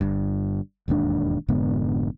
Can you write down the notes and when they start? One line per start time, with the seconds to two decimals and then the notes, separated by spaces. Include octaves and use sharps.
0.01 G1 G2
0.88 E1 D#2 G#2 D4
1.48 F1 G#2 D3 B3